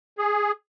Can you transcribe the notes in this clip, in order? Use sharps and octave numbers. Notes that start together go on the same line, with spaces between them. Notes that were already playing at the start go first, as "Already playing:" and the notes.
G#4